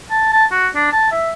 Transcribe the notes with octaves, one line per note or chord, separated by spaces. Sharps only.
A5
A5
F#4
D4
A5
E5